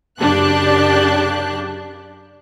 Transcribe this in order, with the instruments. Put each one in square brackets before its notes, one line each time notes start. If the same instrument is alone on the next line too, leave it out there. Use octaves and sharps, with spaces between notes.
[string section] F#2 C#3 D4 G4 A5 F#6